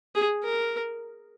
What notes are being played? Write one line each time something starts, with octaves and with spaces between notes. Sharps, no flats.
G#4
A#4